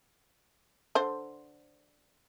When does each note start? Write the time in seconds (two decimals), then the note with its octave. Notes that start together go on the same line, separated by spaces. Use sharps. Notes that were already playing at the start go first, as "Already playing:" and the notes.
0.95 D3 C5